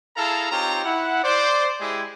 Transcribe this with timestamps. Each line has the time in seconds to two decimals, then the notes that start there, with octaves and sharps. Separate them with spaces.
0.16 E4 G#4 A4 F5 A5 A#5
0.51 C4 D#4 F4 G4 C#5 A#5
0.85 E4 F#5
1.24 C5 D5
1.81 G#3 E4 G4 G#4